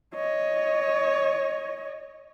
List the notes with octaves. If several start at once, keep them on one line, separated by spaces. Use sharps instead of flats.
C#5 D#5